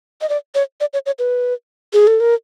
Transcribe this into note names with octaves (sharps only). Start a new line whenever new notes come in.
D#5
D5
C#5
D5
C#5
C#5
B4
G#4
A4
A#4